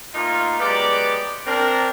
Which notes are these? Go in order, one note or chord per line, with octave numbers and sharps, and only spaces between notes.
A3 A#3 D#4 F4
F#3 G#3 B3 G4 D5
C4 D4 A#4